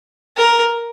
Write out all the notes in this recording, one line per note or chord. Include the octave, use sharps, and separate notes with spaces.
A#4